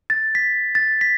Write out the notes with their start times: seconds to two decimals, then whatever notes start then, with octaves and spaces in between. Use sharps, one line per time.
0.10 A6
0.35 B6
0.75 A6
1.01 B6